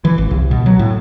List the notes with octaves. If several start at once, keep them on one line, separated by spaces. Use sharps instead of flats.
E3
G#1
C2
B2
F#3
A2